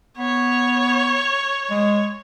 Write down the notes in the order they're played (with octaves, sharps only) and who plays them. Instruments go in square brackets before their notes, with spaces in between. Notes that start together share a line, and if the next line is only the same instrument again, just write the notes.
[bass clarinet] B3 [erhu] C#5
[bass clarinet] G#3